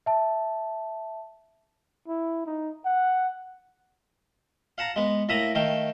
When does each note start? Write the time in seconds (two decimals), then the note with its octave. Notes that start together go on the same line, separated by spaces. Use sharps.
0.06 E5 A5
2.08 E4
2.46 D#4
2.85 F#5
4.78 F5 F#5 A5 A#5
4.96 G#3 B3
5.29 A2 A#3 E5 A#5 D#6
5.55 D#3 A3 F5 G5